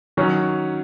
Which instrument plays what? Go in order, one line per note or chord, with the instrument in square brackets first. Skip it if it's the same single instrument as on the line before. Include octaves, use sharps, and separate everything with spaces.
[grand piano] D#3 F#3 C#4